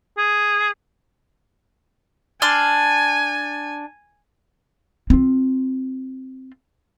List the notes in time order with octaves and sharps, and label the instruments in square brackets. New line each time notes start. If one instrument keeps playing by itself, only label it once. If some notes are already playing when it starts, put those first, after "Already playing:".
[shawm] G#4
[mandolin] D4 C6 F6 [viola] G#5
[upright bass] C4 F4